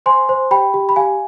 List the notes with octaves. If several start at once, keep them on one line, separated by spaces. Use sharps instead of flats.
C5 G#5 C6
C5
G4 G5 B5
G4
B5
G4 F5 G#5